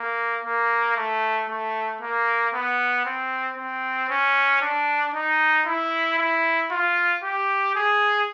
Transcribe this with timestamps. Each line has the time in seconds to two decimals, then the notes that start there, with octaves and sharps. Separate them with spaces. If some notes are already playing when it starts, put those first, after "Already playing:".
Already playing: A#3
0.45 A#3
0.97 A3
1.49 A3
2.01 A#3
2.53 B3
3.05 C4
3.57 C4
4.09 C#4
4.61 D4
5.14 D#4
5.66 E4
6.18 E4
6.71 F4
7.23 G4
7.75 G#4